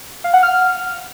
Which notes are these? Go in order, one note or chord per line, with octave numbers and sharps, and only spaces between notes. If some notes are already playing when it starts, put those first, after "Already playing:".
F5
F#5
F6